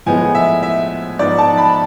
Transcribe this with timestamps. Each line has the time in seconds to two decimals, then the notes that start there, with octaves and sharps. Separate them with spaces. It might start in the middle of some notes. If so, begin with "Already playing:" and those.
0.06 A2 F3 G#3 B3 G#5
0.35 E5
0.63 E5
1.19 G#2 F3 B3 D5
1.38 A5
1.58 B5